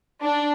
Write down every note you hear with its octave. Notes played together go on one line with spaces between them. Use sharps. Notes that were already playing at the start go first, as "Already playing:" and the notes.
D4